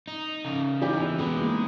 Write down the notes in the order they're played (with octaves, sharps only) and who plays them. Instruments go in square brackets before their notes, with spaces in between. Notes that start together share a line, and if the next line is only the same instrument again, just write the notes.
[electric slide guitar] D#4
C#3
[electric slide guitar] E3 [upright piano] D#4 G4
[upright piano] B3
[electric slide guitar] G#3 [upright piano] B3
[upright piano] A#3